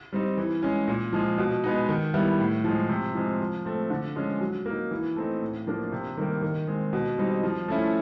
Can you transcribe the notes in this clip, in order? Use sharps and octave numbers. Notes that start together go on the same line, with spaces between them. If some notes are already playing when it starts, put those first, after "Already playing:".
G3 C4 D#4
E3
G#3 C#4
A#2
F3 G#3
B2
G#3 B3 D#4
D#3
G3 B3 E4
A2
F3 G#3
C3
F3 G#3 C4
F3
A3 C4
D3
F3 G#3 C#4
F#3
A#3 D#4
E3
A3 C4 D#4
A2
F3 A#3 D4
C3
D#3 G3 A#3
D#3
G#3 C4
B2
G3 C4 D#4
F3
A3 C#4 E4